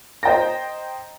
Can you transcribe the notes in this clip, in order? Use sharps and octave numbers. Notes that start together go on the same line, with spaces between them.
C5 D#5 G5 A#5 A6 A#6